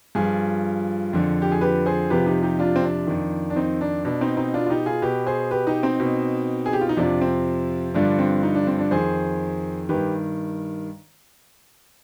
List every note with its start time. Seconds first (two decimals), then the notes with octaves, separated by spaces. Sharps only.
0.15 G2 F3 F4 G#4
1.13 F2 D3 F3
1.42 G4
1.52 G#4
1.61 G4 B4
1.86 G#4 C5
2.10 F2 C3 F3 G4 B4
2.26 D#4 G4
2.42 D#4 G4
2.59 D4 F4
2.76 C4
2.84 D4
3.07 F2 D#3
3.50 D4
3.56 C4 D#4
3.81 D4
4.05 B2 D4
4.21 C4 D#4
4.37 C4 D#4
4.54 D4 F4
4.66 F4
4.69 D#4 G4
4.86 F4 G#4
5.02 B2 G4 B4
5.26 G#4 C5
5.51 G4 B4
5.67 D#4 G4
5.83 C4 D#4
6.00 B2
6.66 G#4
6.73 G4
6.81 F4
6.89 D#4
6.97 F2 C3 F3 D4
7.21 C4
7.94 G2 D3 F3 D4
8.19 C4
8.43 D#4
8.55 D4
8.67 C4
8.79 D4
8.91 F2 D#3 G#4 C5
9.89 G2 D#3 G4 B4